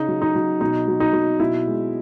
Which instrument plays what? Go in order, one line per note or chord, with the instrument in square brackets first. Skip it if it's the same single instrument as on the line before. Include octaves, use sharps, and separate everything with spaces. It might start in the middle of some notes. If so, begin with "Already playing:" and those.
Already playing: [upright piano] C#3 D#4
F#3
D#4
F#3
B2 D#4
F#3
D#4
F#3
B2 E4
G#3